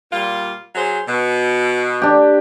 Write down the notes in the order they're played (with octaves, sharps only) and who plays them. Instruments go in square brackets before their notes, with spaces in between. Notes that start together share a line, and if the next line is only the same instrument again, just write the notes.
[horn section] A#2 G3 F4
F#3 G#4 C5
B2
[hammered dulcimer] D4 G4